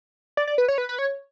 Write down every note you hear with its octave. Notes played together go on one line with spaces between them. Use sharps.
D5
D5
B4
C#5
B4
B4
C#5